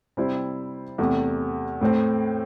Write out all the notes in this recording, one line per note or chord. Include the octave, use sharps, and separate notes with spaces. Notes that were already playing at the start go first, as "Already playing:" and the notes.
C3 G3 E4 C5
E2 C3 A3
A2 A3 C4